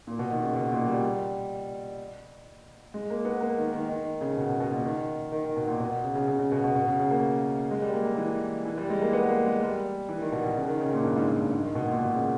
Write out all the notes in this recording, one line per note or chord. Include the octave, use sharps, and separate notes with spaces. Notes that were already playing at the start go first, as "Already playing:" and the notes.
A#2
B2
D#3
C#3
B2
A#2
G3
G#3
A#3
B3
A#3
D#3
D#3
D#3
C#3
B2
B2
B2
A#2
D#3
D#3
D#3
B2
A#2
B2
C#3
C#3
C#3
C#3
B2
B2
B2
C#3
C#3
A#3
G#3
G3
A#3
A#3
E3
E3
G3
G#3
A#3
B3
A#3
G#3
G3
E3
D#3
B2
B2
C#3
D#3
C#3
A#2
G2
G#2
A#2
G2
G#2
D#3
B2
A#2
B2
C#3